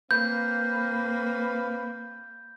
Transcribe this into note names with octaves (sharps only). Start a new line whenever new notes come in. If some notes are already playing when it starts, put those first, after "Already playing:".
A#3 C4 B4 F5 G6